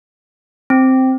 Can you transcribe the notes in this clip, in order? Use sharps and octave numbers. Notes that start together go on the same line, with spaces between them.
C4